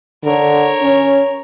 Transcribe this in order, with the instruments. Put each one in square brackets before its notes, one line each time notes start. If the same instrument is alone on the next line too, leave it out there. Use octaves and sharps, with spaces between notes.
[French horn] D3 [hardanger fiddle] A#4 C#5
[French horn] C#4